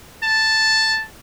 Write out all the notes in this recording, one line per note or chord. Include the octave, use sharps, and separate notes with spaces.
A5